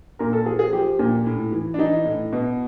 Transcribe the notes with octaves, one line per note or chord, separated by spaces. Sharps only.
A#2 A#4
A4
F3 G#4
G#4
F3 G4
A#2
A2
E3
D4
E3 D#4
A2
B2